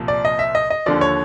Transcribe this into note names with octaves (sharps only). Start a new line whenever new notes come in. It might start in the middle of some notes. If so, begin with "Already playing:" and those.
Already playing: C2 A#2 F3
D5
D#5
E5
D#5
D#5
D#2 D3 F3 D5
C#5